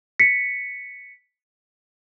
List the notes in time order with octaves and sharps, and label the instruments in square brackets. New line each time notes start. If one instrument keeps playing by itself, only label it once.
[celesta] B6 C#7